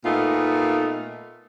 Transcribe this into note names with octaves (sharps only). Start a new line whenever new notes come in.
A#2 A3 B3 D#4 F4